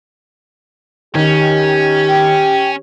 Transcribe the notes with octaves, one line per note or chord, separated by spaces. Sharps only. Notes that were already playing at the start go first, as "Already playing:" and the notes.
D#3 C#4 G4
G5